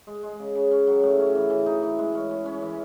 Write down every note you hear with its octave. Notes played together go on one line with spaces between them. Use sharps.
G#3
G#3
C#3
C#3
C#4
F#3
A2
C#4
E3
E3
D#4
E3
G#3
C#4
C#4
C#4
E3